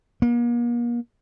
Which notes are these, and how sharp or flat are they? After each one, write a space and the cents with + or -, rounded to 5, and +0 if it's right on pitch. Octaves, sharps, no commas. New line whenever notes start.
A#3 +40